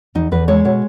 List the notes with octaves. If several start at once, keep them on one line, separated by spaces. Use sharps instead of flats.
E2 D#4
E2 B4
G#3 C#5
B2 C#5